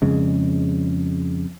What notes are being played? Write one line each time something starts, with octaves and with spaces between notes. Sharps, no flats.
F2 C#3 G#3